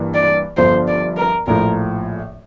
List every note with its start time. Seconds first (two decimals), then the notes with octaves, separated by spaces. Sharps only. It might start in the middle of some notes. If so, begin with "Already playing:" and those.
Already playing: G2 E3 A#3
0.14 D5
0.57 G1 G2 D3 F3 C5
0.88 D5
1.17 A#4
1.47 A#1 A2 F3 A#4